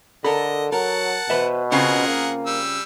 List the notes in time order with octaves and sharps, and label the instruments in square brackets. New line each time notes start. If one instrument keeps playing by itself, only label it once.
[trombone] D3 [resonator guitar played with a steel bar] A4 A#4 [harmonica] D#5 [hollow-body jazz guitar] B5
[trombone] F#3 [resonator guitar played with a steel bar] A#4 [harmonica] F#5 A5
[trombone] B2 [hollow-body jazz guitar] B4 C5 E5
[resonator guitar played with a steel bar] C#3 C4 F4 [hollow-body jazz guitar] C#4 [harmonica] G#4 A#4 F#5
[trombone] A#3
[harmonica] G3 E6